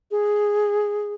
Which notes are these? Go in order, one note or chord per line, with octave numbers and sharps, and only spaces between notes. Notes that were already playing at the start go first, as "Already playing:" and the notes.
G#4